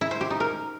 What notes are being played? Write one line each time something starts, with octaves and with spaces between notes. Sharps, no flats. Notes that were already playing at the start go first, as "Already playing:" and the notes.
E4
C5
G4
D#4
A#4